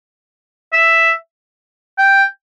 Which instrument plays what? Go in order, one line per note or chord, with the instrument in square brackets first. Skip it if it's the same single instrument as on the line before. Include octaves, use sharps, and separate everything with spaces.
[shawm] E5
G5